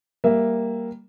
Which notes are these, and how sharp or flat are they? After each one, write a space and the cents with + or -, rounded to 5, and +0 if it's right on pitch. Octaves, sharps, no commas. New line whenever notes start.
G3 +0 A#3 +0 E5 +5